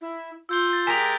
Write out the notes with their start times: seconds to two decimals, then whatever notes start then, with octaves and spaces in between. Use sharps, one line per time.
0.01 E4
0.49 F4 E6 G6 G7
0.73 A6
0.87 G#3 G4 A#4 G#5 B6 F7